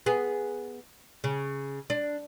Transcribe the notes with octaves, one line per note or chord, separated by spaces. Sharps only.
B3 G#4
C#3
D4